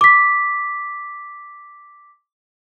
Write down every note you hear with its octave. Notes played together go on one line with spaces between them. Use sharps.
D6 B6